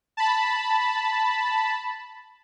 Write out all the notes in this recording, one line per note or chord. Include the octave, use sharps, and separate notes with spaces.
A5 B5